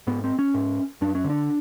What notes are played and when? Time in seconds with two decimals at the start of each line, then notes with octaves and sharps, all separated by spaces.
0.07 G#2 B3
0.24 C4
0.39 C#4
0.54 G#2
1.01 F#2 D4
1.15 C#4
1.24 D3
1.30 D4